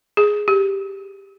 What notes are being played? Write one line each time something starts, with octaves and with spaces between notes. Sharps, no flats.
G#4
G4